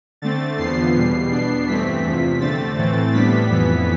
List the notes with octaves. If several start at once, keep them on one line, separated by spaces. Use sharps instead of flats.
D3 A3 C4 A6
E2 D3 F3 B3 C7
E2 B2 G3 C7
B2 B3 D4 C7
G2 E3 A3 C4 B6
E2 C3 F3
D3 A3 C4 A6
A2 E3 A3 C4
A2 G3 B3 D4 B6
F2 E3 B3